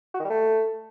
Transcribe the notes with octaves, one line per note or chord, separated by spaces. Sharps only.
F#4
D#3
G3
A3